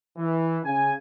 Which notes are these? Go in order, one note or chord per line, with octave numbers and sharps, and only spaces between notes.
E3
C#3 G#5